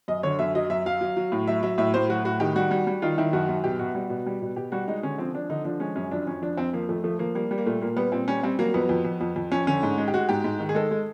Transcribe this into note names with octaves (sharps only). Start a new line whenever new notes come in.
F#2 D#5
D3 C#5
F#2 E5
F#3 D#5
F#2 E5
F#3 F5
F#3
F#3
A2
F#3 E5
F#3 E5
A2 E5
A2 C5
F#3 F#4
A2 F#4
D#3 G4
G3 F#4
G3
G3
D#3 F4
D#3 E4
F#2 F#4
F#2
B2 G4
B2 F#4
G3
B2
G3
B2
B2 G4
G3 F#4
G#3 D#4
D3 C#4
F3 C4
F3 D4
D3 D#4
F3 D4
G#3 C#4
F#2 C#4
F2 D4
F2 C#4
F3 D4
F2 C4
F3 A#3
F2 A3
F3 A3
F3 A#3
G3 A#3
G3
A#3
A#2 A3
A#2 A#3
G3 B3
A#2 C4
G3 C#4
G3 C4
F#3 A#3
F2 B3
F2
F2
F2
F2
F2 C#4
D3 C#4
G#2
G#3
G4
G#3 F#4
G#2 G4
G#2
D#3
G#4
G#3 A4
G#3